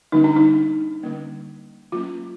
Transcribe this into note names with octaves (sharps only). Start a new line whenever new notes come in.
D3 G3 A#3 C#4 D#4
D4
D#4
D3 G3 A#3 C#4
F#3 A#3 C#4 F4